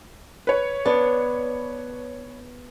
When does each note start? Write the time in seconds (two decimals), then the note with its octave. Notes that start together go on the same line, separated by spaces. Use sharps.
0.47 B4 C#5
0.85 B3 D4